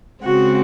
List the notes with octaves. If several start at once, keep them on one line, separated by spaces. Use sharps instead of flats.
C#3 G#3 C4 F#4